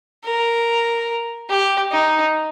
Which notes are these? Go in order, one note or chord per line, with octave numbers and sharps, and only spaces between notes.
A#4
G4
D#4